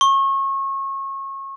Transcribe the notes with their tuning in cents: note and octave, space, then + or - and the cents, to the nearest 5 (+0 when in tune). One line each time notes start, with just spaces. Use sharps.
C#6 -30